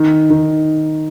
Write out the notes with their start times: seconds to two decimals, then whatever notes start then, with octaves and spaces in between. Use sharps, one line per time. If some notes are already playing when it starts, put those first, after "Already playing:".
Already playing: D#3
0.30 D#3